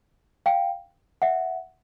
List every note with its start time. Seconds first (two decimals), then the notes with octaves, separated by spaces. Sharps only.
0.46 F5 G5
1.22 E5 F#5